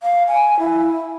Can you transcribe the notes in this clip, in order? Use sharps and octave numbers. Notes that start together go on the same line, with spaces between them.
F5
G#5
E4